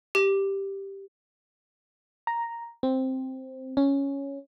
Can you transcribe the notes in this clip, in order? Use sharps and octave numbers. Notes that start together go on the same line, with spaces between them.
G4
A#5
C4
C#4